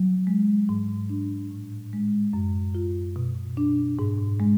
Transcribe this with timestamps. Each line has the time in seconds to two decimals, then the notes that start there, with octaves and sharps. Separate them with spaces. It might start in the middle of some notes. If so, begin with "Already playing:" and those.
Already playing: F#3
0.27 G#3
0.69 G#2
1.09 D4
1.51 A2
1.93 G#3
2.33 F#2
2.75 F4
3.16 B2
3.57 D4
3.99 G#2
4.40 G#3